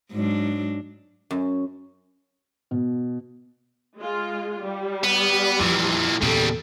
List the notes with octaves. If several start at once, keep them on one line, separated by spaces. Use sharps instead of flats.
G#2 F#3 D4
F#2
B2
G#3 F4
G3
B3
F2 A#2 E3
E2 A#2 C#3 G3 A4